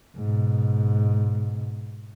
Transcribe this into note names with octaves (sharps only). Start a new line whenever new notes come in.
G#2 B2